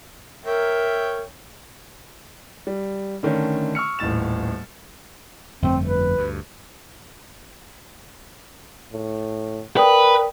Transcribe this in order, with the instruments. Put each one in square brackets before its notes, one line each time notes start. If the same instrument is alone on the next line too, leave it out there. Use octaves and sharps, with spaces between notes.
[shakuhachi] A#4 [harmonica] C#5 E5 G5
[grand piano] G3
D3 D#3 A3 C#4
C#6 E6 F6 C#7
D#1 A1 A2 A6 E7
[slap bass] G1 F2 A3 [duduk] C4
[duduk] B4
[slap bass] D2 G2
[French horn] A2
[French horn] A#4 [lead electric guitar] B4 [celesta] D5 G5 D#6